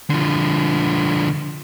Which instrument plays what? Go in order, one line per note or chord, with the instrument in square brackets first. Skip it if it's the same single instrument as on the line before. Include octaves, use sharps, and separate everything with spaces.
[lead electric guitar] D3 F3